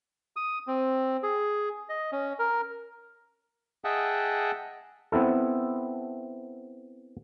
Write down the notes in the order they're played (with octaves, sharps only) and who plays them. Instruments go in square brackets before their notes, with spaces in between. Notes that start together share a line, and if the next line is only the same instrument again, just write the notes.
[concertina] D#6
C4
G#4
D#5
C#4
A#4
[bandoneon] G#4 D#5 E5 F#5 G5 A5
[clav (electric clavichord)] B3 C4 E4 A4